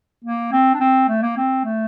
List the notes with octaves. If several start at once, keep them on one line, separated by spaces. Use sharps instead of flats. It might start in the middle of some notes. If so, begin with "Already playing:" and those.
A#3
C4
D4
C4
A3
A#3
C4
A3